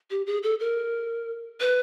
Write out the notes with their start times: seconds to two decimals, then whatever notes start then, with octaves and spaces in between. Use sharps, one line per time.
0.10 G4
0.26 G#4
0.43 A4
0.60 A#4
1.60 B4